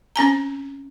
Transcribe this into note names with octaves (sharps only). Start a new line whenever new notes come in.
C4 C#4 G#5 A#5